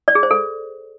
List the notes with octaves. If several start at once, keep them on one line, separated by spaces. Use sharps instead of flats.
D5
G#4
C5
A4